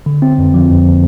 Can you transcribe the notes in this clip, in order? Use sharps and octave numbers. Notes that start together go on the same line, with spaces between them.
D3
C4
F2
F3
F2